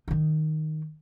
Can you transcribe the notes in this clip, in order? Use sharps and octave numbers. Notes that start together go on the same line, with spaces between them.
D#3 D#4